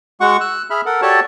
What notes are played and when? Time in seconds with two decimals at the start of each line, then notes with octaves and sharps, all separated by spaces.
0.21 G#3 F#4 F#5 C#6
0.41 E6 F#6
0.70 G#4 E5 B5 F6
0.86 A4 A#4 F#5
1.02 F#4 G4 A4 C#5 D5 A5